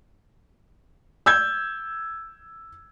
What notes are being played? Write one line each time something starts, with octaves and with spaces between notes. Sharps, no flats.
E6 G6 G#6